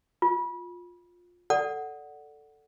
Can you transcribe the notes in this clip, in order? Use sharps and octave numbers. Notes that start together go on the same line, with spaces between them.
F4
A4 D5 F#5